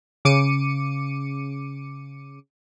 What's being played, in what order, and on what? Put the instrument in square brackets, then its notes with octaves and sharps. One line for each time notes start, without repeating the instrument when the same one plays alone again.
[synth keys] C#3 D6 C#7 D#7